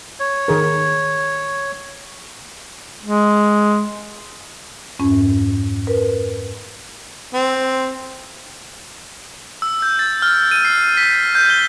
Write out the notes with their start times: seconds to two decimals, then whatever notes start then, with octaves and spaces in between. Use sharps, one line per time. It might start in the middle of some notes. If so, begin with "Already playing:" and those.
0.20 C#5
0.48 D#3 G#4 A#4
3.03 G#3
4.99 F2 G#2 C#4
5.87 A#4 B4
7.34 C4
9.62 E6
9.82 G6
9.99 A6
10.22 F6
10.51 D#7
10.65 C7
10.97 B6
11.35 G6
11.50 G7